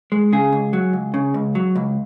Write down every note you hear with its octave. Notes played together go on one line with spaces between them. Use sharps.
G#3
C#3 G#4
C#2
F#3
C#2
C#3
C#2
F#3
C#2